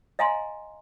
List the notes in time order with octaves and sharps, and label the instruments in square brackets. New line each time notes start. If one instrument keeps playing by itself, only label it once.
[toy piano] D#5 F5 G#5 A#5 C6